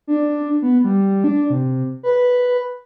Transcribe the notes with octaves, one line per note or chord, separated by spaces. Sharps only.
D4
B3
G3
D4
C3
B4